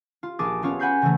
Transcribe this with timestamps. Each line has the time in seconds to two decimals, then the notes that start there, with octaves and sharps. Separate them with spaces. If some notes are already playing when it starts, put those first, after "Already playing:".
0.23 F4
0.39 A#1 G#4 D6 A6
0.62 B3 C#4 F4 C#5
0.79 F#5 G#5 B5 G6 G#6 C7
1.02 C#3 E3 A3